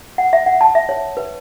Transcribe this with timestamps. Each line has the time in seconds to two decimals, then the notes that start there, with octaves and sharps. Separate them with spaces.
0.18 F#5
0.33 E5
0.46 F#5
0.61 A5
0.75 E5
0.89 C#5
1.17 B4